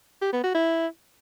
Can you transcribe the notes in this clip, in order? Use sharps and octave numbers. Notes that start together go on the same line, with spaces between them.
G4
B3
F#4
E4